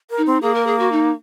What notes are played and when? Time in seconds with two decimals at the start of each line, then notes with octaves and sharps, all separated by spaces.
0.10 A#4
0.18 D#4
0.26 C4
0.42 A#3 G#4
0.55 A#4
0.67 G#4
0.79 F#4
0.92 D#4